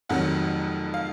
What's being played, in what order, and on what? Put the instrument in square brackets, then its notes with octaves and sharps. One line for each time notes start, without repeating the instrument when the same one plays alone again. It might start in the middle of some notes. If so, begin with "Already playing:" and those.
[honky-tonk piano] F1 F2 D#3 F#3 F#5
F5